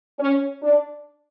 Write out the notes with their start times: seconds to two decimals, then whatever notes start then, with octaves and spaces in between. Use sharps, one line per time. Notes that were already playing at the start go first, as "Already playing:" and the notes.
0.20 C#4
0.63 D4